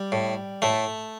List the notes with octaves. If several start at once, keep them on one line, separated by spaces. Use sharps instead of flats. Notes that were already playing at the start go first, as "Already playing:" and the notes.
Already playing: G3
A2
A2 A3